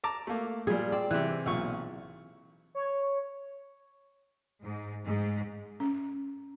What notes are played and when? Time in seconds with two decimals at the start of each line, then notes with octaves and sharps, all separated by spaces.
0.04 A5 A#5 D6
0.27 A3 A#3
0.67 A#2 G3 G#4
0.92 C4 D5
1.11 C3 E3 F#6
1.46 B1 A#2 C#6
2.75 C#5
4.63 G#2
5.05 G#2
5.80 C#4